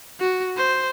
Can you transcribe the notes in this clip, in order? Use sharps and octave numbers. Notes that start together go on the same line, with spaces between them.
F#4
C5